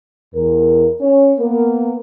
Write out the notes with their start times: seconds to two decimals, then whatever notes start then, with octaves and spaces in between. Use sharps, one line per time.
0.34 E2 A#4
1.01 C#4 C#5
1.39 A#3 B3 A#4